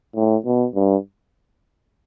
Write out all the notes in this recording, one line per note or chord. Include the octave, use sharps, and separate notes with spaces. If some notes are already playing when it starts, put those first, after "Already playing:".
A2
B2
G2